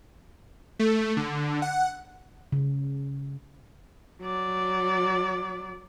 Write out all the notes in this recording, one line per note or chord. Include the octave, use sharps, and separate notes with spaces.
A3
D3
F#5
C#3
F#3 D5